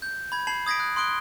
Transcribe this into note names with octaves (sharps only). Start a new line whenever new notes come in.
G6
B5 G#6
A5 B5 G#6 C7 F#7
D#6 G#6 A#6 B6 D7
F#6
C6 D#6 F#6 D7 G7